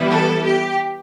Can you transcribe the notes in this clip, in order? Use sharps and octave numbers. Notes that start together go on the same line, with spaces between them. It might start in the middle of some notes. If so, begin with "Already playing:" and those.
Already playing: E3 G3 B3 E4
A4
G4